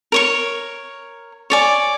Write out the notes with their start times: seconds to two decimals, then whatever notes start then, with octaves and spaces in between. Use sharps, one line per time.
0.12 A#4 C#5 C#6
1.50 C#5 D5 G#5